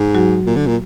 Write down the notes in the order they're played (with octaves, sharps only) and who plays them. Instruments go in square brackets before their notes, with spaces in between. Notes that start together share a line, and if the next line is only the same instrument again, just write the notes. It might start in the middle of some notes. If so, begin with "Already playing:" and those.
Already playing: [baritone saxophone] G#2
[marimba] F#3 F#4
[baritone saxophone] A#2
D3
A#2